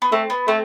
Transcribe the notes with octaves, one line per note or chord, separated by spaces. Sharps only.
B3
A3 C4
B3
A3 C4